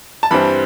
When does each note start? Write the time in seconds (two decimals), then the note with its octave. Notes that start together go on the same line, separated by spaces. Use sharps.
0.23 A5
0.31 G2 E3 G3 C4 B5